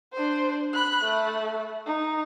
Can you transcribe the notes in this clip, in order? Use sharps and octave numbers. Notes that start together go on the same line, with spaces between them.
D4 C5
B5 F#6
A3
D#4